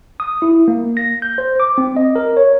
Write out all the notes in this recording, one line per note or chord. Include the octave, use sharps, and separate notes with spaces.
D#6
E4
A#3
A#6
G6
C5
D6
C4
D#5
A#4
C#5